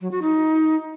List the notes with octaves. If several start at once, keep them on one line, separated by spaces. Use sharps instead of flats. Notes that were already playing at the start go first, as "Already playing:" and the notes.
F#3
F#4
D#4